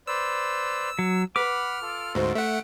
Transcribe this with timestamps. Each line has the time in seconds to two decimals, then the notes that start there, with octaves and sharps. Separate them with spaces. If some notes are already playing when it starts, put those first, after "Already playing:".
0.07 B4 C5 D5 E6
0.99 F#3
1.36 B4 F#5 B5 D6 F6
1.82 F4 A4
2.15 D2 G#2 C#4 F#4 C5
2.35 A3 E5 F#5